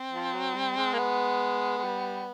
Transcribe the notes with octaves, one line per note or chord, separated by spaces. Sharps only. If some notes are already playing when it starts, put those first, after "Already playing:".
Already playing: C4
F3
F#3
G3
G#3
A#3
B3
G#3
G3